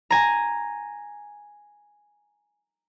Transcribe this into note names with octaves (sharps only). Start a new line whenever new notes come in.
G#5 A#5